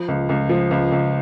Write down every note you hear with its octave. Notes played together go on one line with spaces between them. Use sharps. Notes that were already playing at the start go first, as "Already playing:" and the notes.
Already playing: F3
C#2
C#2
F3
C#2
C#2